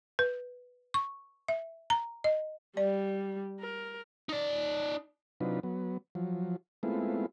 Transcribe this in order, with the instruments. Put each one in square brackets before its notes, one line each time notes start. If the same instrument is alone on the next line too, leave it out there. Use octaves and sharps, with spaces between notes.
[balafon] B4
C#6
E5
A#5
D#5
[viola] G3 [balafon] D5
[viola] A#4
[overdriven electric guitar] D#4 D5
[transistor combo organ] C3 F#3 D4 D#4 F4 B4
F#3 B3
F3 F#3
G#3 A3 B3 C4 E4 F4